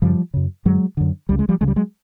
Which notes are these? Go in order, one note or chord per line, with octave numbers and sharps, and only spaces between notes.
F#2 C#3 F3 G3
F#2 C#3
F#2 D3 F#3 G#3
F#2 D3
C#2 C#3 G3
G#3
F3 G3
C#2 C#3 G#3
G3
F#3 G#3